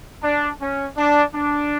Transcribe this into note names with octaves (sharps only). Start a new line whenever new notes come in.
D4
C#4
D4
D4